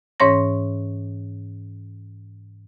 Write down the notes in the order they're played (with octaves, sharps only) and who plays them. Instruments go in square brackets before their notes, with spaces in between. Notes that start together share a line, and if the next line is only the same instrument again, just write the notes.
[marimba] G#2 E3 C#4 C#5 C6 A#6